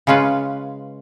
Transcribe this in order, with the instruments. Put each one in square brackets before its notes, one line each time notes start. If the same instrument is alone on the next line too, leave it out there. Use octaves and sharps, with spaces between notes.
[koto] C#3 G#3 C#4 F4 B4